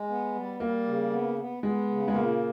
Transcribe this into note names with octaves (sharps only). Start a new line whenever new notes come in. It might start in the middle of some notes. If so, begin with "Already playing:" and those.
Already playing: G#3
B3
G3
G3 A#3
C#3
B3
B3
G#3 B3
C#3
G#3
A#2 A#3